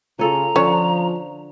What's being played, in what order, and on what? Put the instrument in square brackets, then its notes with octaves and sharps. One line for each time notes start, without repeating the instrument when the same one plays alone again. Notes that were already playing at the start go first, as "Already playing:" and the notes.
[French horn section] C#3 F4 [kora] C#4 A4 [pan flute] A#5
[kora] D3 [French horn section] F3 [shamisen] C#4 C#5